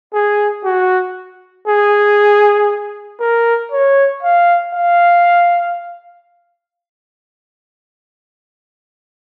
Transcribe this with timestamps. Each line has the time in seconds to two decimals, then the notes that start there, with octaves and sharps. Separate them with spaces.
0.14 G#4
0.64 F#4
1.67 G#4
3.20 A#4
3.71 C#5
4.23 F5
4.74 F5